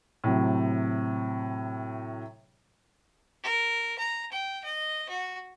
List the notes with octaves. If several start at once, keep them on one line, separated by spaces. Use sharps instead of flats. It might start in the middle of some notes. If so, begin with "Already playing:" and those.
A2 C3 F#3
A#4
A#5
G5
D#5
F#4